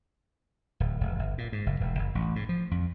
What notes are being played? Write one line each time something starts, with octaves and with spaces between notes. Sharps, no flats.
D1
E1
G1
A#2
G#2
F#1
E1
F#1
A1
G#2
F3
F2